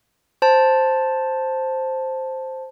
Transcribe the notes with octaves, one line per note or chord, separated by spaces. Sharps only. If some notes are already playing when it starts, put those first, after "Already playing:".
C5 A5